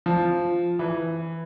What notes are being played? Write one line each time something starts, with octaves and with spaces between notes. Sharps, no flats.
F3
E3